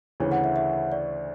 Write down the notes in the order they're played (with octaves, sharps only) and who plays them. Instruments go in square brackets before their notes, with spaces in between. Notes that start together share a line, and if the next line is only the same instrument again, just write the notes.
[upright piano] D2 C#3 E3 [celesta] C#5
[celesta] F#5
E5
E5
D5